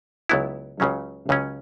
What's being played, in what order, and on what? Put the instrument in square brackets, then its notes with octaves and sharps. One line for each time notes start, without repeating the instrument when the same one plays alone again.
[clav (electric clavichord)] C#2 C#3 F#3 B3 E4
C#2 C#3 F#3 C#4
C#2 C#3 F#3 C#4